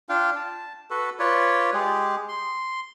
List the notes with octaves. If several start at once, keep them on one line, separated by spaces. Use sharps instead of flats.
D4 F4 F5 G5
A5
F#4 A4 B4
F4 B4 C#5 D5
G#3 G4 G#4
C6